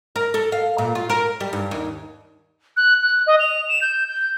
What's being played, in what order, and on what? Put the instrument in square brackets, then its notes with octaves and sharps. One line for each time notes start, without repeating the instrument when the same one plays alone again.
[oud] A#4
A4
F5
A#2
F4
A#4
G3
G2
D#2
[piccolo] F#6
F#6
D#5
F7
E7
G6
G6